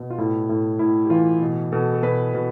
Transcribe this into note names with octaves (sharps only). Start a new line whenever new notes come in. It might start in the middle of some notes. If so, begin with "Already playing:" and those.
Already playing: B2
F4
A2 E4
A2
A2 E4
G4
E3 F4
B2
B2 A4
A4
B2 B4
B2 B4